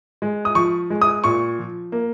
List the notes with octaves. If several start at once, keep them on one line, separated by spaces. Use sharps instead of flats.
G#3
D#6
F3 C#6
G#3
D#6
A#2 C#6
F3
A#3